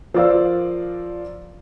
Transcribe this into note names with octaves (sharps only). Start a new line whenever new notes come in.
F3 A#4 D5 F5 E6